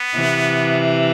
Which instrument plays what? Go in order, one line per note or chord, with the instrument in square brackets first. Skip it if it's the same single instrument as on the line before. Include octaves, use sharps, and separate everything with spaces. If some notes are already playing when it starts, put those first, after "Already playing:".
Already playing: [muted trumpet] B3
[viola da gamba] C3 E3